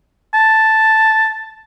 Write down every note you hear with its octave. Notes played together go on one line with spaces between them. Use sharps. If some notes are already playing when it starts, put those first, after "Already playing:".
A5